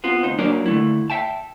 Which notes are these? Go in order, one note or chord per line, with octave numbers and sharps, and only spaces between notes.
B3 C4 F4
D2 D#4 C5
F#3 A#3 D4 A#4 D5
D3 A3 E4
E5 G5 A5